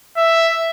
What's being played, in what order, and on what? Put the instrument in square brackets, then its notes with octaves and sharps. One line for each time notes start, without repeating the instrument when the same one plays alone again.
[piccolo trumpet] E5